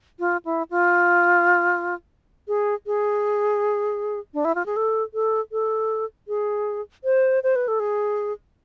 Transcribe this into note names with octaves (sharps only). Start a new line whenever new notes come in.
F4
E4
F4
G#4
G#4
D4
E4
F4
G#4
A4
A4
A4
G#4
C5
C5
B4
A4
G#4